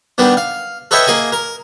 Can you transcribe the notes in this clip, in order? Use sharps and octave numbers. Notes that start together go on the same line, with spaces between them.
D#3 G3 B3 D4
F5
A4 B4 C#5 D#5 E5 G5
A#3 G#4 D#5 G#5
A#4